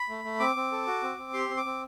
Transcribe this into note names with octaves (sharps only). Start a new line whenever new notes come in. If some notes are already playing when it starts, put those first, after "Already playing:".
Already playing: B5
A3
A3
C4 D6
C4
A4
F#4
C4
C4
G4 C6
C4
D6
C4